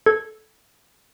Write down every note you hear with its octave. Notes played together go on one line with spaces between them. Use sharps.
A4 G#6